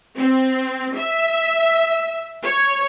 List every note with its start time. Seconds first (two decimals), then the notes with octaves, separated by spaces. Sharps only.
0.17 C4
0.95 E5
2.42 C#5